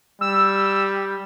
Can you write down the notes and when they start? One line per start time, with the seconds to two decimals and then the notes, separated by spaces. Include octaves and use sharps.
0.21 G3 E6